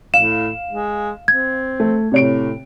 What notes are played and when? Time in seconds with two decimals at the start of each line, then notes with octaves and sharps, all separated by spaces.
0.14 A2 F5 E7
0.71 G#3
1.28 C4 G#6
1.80 A3
2.12 A2 C3 C#5 D7